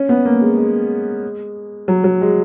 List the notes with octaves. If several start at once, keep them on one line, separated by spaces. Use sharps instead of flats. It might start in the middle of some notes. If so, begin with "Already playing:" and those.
Already playing: C#4
B3
A#3
G#3
G#3
F#3
F#3
G#3